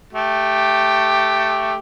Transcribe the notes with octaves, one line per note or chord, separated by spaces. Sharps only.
A3 G4